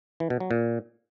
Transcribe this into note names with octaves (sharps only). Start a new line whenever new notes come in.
E3
B2
F#3
A#2